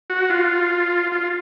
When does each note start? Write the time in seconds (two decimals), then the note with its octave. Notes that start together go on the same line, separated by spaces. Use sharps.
0.10 F#4
0.30 F4
1.12 F4